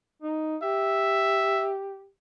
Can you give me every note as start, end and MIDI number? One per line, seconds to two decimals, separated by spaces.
0.22 0.56 63
0.63 2.06 67
0.63 1.72 76